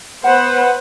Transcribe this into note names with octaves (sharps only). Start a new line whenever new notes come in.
B3 B4 C5 F#5